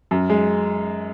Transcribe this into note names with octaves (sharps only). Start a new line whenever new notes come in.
F#2
G#3